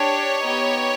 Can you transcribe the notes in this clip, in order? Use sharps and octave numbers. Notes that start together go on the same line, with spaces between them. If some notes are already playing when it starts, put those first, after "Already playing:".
Already playing: D4 G4 C#5
B3 D#4 G4